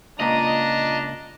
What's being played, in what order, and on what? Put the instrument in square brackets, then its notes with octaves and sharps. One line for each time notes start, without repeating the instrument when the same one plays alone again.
[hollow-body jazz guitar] C#2 A#2 B5 [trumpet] D4 [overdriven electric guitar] D#5 [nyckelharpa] A#5